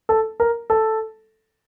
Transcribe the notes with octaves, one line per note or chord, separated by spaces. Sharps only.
A4
A#4
A4